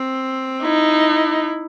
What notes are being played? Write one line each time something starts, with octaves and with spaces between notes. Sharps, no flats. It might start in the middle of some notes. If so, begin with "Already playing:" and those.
Already playing: C4
D#4 E4